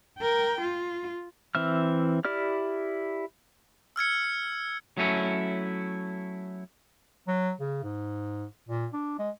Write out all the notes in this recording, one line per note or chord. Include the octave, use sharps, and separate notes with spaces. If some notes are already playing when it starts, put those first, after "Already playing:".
A#4 G5
F4
E3 C4 E5 F6
E4 G4 D5 F6
E6 F6 G#6 C#7
F#3 A3 C#4 E4
F#3
C#3
G#2
A#2
D4
G#3